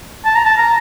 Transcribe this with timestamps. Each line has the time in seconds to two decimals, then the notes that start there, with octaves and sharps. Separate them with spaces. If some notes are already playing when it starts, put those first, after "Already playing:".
0.25 A5
0.35 A#5
0.45 A5
0.58 A#5